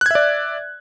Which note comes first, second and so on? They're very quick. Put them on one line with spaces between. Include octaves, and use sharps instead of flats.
F#6 G#6 E5 D5